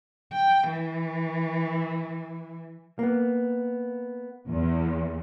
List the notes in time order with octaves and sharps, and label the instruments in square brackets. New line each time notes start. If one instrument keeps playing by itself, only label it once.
[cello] G5
E3
[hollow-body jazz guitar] A#3 B3
[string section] E2